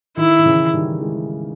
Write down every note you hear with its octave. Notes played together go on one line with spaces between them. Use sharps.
D#3 E4
D#3
C#3 E3
D#3 G3
E3 G#3